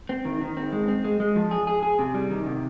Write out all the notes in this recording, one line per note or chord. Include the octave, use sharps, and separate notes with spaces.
C4
D#3
D#3
C4
G#3
C4
G#3
G#3
F3
G#4
G#4
G#4
C3
G3
D#3
C3